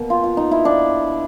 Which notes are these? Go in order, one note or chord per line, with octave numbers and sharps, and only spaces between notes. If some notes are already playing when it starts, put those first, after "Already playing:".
Already playing: B2 A#3
F4
F4
D#4
E4
D4